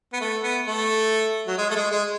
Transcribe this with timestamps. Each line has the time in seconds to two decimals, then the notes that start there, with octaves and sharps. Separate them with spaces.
0.13 B3
0.20 A3
0.43 B3
0.66 A3
1.47 F#3
1.58 G#3
1.70 A3
1.75 G#3
1.91 G#3